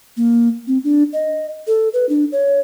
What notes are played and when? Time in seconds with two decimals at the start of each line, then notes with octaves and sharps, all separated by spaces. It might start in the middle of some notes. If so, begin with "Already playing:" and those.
0.17 A#3
0.67 C4
0.84 D4
1.13 D#5
1.67 A4
1.93 B4
2.09 D4
2.32 C#5